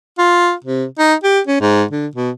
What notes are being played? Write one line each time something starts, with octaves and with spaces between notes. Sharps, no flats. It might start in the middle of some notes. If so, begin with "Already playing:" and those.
F4
C3
D#4
G4
C#4
G#2
D3
B2